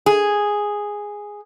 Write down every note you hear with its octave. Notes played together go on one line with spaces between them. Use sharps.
G#4